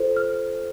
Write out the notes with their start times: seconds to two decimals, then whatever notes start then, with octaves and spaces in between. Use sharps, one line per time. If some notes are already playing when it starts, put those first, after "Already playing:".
Already playing: F4 A4 C5
0.16 F6